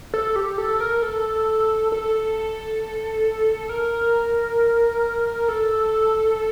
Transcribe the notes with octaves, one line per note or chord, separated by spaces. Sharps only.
A4
G4
A4
A#4
A4
A4
A#4
A4